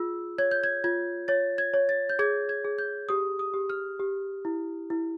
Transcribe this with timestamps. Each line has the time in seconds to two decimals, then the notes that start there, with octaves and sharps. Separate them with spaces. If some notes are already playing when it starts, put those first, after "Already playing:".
Already playing: F4 G#4 E6
0.38 C#5 G#6
0.51 G6
0.64 G#6
0.84 F4 G#6
1.28 C#5 A6
1.58 G#6
1.74 C#5
1.89 A6
2.09 G6
2.19 G#4 G#6
2.49 G#6
2.65 G#4
2.78 G6
3.09 G4 D#6
3.39 D#6
3.54 G4
3.70 F6
4.00 G4
4.45 E4
4.90 E4